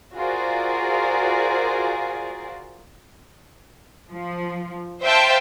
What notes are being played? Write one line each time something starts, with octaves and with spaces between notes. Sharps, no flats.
F4 F#4 G#4 A#4 C5 D5
F3
C5 E5 F5 G5 A5